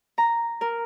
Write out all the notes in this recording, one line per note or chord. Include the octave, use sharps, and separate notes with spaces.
A#5
A#4